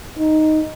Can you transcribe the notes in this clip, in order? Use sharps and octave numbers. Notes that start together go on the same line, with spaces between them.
D#4